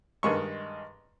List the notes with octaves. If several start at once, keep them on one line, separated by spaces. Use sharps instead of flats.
G2 D#3 G#3 C#6